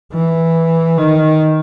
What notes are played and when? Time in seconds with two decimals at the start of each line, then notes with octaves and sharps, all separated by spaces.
0.13 E3
0.98 D#3